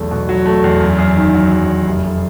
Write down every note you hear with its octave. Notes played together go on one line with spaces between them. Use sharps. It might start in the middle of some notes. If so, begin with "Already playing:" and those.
Already playing: B1 E2 A3
B2
F#3
A3
E2
F#2
F#2
D#3
F#3
F#2
F#2
F1
F1